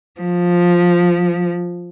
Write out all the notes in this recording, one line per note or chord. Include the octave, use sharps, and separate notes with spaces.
F3